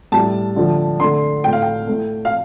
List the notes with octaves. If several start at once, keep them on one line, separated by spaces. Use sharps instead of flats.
A2 G3 A5
D3 F3 A3
D3 A3 C6
A2 A3 G5
F5
G5
A2 A3
F5